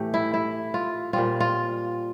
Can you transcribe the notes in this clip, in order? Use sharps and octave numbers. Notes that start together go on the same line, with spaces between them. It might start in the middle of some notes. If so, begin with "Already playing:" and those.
Already playing: A2 E3 A3 G4
E4
E4
F4
A#2 G3 C4 F4
F4